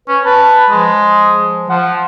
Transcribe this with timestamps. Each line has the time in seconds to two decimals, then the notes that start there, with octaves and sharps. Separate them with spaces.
0.08 C#4 B4
0.25 B4 A5
0.70 F3 G#3
1.70 F3 F#5